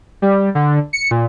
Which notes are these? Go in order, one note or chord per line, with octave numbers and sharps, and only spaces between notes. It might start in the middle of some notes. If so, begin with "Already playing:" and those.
G3
D3
C#7
A#2